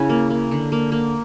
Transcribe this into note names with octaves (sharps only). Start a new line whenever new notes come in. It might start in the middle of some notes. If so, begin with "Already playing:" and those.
Already playing: C#3 C#4 E4
A#3
A#3
D3
A#3
A#3